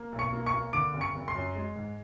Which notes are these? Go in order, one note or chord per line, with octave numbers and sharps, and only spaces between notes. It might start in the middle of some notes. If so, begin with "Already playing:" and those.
Already playing: A#3
B1
C#6 C#7
A#3
C#6 C#7
A#3
D3 D6 D7
F#1
C#6 C#7
F#1
C6 C7
F#2
G#3
G#2